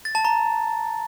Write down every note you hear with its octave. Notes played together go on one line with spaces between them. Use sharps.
A6
A5
A#5